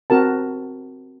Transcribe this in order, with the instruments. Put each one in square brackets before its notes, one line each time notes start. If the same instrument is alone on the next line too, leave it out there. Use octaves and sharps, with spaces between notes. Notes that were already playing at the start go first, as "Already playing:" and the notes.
[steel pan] C4 F#4 A#4 A5